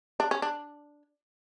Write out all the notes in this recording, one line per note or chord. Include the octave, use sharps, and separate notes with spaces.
D4
C#4
D4